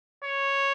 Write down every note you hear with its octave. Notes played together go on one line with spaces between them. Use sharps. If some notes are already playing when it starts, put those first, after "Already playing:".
C#5